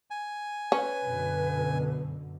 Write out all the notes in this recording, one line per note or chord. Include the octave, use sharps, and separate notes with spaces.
G#5
C#4 B4
F#2 B2 D3